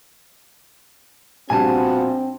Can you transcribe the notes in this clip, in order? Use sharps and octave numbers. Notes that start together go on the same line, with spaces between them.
A#1 G3 B3 C4 F4 F#4 G#5 A5